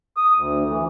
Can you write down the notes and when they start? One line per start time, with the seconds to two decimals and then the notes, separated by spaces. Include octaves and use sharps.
0.17 D#6
0.36 D2
0.69 E3